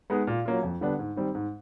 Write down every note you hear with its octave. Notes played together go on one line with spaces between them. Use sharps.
G#3 B3 D#4 G#4
A#2
F#3 A#3 C#4 F4
F2
D3 G3 B3 D4
G#2
D#3 G3 C4
G#2